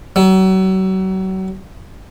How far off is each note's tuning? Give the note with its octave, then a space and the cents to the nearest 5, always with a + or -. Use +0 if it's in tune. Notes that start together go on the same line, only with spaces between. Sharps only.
F#3 +35